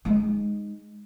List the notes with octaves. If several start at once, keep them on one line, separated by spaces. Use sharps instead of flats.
G#3 D#4